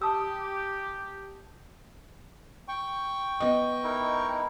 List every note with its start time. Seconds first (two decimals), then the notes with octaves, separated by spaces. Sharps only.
0.02 G4 A5 D#6 E6
2.68 G5 C#6
3.40 B3 D#5
3.84 D#4 E4 A#4